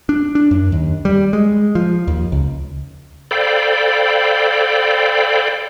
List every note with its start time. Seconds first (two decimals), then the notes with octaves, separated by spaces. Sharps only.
0.09 D4
0.35 D4
0.51 F#2
0.72 D#2
1.05 G3
1.33 G#3
1.75 F3
2.07 D#2
2.32 C#2
3.31 A4 C5 D5 F5 G5 B5